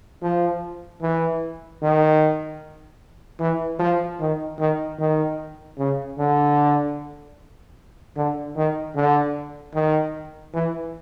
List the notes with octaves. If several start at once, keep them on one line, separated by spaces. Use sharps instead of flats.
F3
E3
D#3
E3
F3
D#3
D#3
D#3
C#3
D3
D3
D#3
D3
D#3
E3